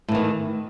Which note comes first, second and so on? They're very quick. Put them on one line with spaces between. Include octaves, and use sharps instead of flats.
A2 E3 D#3